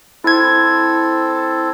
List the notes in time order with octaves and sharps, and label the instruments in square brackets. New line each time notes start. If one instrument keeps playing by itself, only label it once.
[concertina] C4 A4 [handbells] E4 G#6